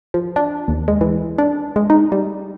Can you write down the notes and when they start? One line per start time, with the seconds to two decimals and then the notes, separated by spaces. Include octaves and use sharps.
0.14 F3
0.36 D4
0.68 D#2
0.88 G#3
1.01 E3
1.38 D4
1.76 G#3
1.90 D#4
2.12 G3